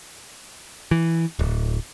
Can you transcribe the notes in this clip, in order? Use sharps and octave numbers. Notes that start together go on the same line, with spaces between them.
E3
D1